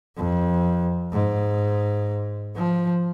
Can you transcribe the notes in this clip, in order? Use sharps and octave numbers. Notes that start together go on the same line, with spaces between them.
F2
G#2
F3